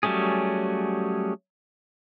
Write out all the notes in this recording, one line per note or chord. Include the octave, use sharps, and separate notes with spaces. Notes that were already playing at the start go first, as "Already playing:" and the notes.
F#3 G3 A3 C#4 G#4